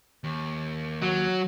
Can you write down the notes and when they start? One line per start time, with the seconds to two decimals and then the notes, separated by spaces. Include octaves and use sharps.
0.24 D#2
1.02 F#3